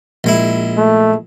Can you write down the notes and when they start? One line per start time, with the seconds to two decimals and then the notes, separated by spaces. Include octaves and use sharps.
0.24 A#1 G#3 E4
0.77 A3